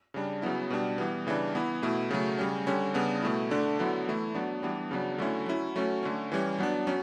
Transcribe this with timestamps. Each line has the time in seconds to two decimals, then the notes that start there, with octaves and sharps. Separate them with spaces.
0.14 C#3 G3 D4
0.42 C#3 F#3 B3 E4
0.70 B2 G3 D4
0.98 E3 G3 B3
1.27 C#3 E3 G3 D4
1.55 E3 B3 E4
1.82 B2 A3 E4
2.10 C#3 F#3 A3
2.38 C#3 G3 C#4
2.67 D3 G3 C#4
2.94 C#3 G3 B3 D4
3.23 B2 A3 E4
3.51 D3 A3 D4
3.79 D3 F#3 B3 E4
4.07 E3 A3 E4
4.35 F#3 B3 D4
4.63 E3 G3 B3 D4
4.91 C#3 F#3 B3 D4
5.18 D3 F#3 A3 C#4 E4
5.46 F#3 C#4 E4
5.76 F#3 A3 C#4
6.03 D3 A3 C#4
6.32 E3 G3 C#4
6.59 F#3 B3 D4
6.87 F#3 C#4